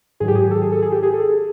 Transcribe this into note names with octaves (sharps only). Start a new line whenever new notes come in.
G#2 D#3 F#3 G#4
G4
G#4
A4
G#4
A4
G#4
G4
G#4
A4